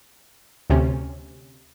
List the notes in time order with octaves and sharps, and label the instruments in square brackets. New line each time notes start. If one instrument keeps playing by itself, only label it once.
[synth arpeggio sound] D2 C3 C#4